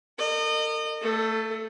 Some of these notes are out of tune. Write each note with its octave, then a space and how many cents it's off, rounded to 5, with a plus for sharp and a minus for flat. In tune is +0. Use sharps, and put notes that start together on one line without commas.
A#4 -40 D#5 -30
A3 +25 A4 +0